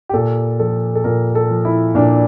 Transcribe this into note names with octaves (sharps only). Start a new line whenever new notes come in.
G4
A#2 A4
F3 A4
A4
A#2 A#4
A4
F3
E4
A#2 D4